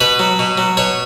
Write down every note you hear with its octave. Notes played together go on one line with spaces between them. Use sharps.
B2 B4
F#3
B2
F#3
B2 C#5